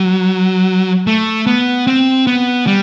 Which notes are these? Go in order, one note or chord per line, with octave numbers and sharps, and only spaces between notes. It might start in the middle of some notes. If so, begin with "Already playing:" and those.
Already playing: F#3
A3
B3
C4
B3
G3